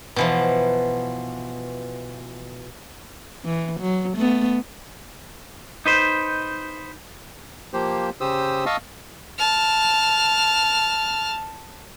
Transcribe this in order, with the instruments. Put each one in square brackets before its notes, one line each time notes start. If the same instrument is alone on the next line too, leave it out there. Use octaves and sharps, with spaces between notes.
[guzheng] B2 E3 F3
[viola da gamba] E3
F#3
A3 B3
[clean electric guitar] D#4 B4 C5
[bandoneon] F3 A#3 G4 C5
C#3 G4 C5 D#6 E6
D#5 F5 A5 C#6 D#6 E6
[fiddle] A5 F6